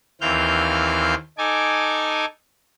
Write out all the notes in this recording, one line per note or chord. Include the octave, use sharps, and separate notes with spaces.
D#2 E3 C4 F5 F6 G6
D#4 A4 G#5 D6